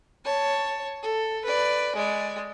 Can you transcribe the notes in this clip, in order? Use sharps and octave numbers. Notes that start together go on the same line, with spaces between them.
C#5 A5
A4
B4 D5
G#3 D5